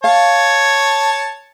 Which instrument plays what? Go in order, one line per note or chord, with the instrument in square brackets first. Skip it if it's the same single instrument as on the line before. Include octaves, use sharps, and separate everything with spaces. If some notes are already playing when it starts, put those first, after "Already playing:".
[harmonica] C#5 A5 [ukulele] F5